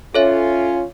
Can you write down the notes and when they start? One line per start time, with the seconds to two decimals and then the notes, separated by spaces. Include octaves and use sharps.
0.15 C#4 F4 A4 C#5 E5